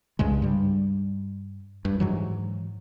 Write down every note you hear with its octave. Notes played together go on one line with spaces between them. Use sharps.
C2 G2 C#3 G#3
G2 G3
G2
G#2 E3 F#3